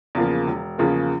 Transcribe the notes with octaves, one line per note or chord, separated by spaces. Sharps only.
E2 C#3 F3 A#3
E1
E2 C#3 F3 A#3